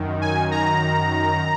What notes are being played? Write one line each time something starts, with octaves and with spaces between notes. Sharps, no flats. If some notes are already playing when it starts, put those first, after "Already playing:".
Already playing: F#2 D#3
G#5
A#5